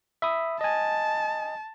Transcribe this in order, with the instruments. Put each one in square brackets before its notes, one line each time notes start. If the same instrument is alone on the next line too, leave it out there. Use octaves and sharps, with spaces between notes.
[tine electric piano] E5 B5 D#6
[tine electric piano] D#5 G#5 [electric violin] A5